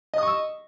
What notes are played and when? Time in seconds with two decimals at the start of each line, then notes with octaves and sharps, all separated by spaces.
0.14 D#5
0.18 D#6
0.23 C#6
0.27 E6